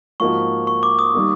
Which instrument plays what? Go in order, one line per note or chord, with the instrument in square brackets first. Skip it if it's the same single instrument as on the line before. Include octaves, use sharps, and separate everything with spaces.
[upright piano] G#2 F3 A#3 D#4 F#4 [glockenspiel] C#6
[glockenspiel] C#6
D6
D#6
[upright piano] D#3 G3 A#3